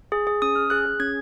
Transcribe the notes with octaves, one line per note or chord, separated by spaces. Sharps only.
G#4
G#4
C#4 D#6
C#4 F6
G#4 F#6
G#4
C#4 G#6